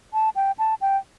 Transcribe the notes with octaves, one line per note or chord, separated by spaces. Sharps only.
A5
G5
A5
G5